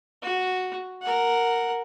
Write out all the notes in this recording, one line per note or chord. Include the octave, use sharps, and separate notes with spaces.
F#4
A#4 F#5